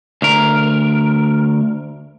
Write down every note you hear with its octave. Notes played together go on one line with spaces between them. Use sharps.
D2 A#4